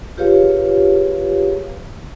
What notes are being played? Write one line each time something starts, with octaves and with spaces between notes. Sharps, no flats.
F4 G4 G#4 B4 C#5 F5